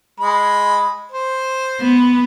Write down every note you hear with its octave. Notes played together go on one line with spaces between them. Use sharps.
G#3 B5
C5
B3